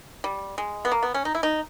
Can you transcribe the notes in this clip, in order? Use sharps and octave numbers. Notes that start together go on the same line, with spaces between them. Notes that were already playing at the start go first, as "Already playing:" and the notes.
G3
G#3
B3
A#3
B3
C#4
D#4
E4
D#4